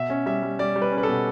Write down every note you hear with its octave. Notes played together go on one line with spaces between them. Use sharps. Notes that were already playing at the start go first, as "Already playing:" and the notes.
Already playing: B2 E5
C#4
G3 E5
G3
G3 D5
G3
B4
C#4
B4
A4
B2